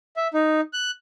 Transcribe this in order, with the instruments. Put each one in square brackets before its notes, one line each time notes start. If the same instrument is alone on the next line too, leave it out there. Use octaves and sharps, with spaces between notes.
[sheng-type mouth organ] E5
D#4
F#6